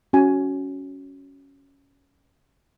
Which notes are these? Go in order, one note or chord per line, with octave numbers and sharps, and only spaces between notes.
C#4 F#4 G#5